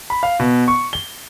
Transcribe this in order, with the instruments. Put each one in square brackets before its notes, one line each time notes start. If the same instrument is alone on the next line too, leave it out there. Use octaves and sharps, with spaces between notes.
[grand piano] B5
F5
B2
C#6
G7